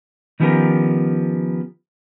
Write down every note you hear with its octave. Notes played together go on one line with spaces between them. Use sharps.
D#3 F3 B3 C#4 G4 A#4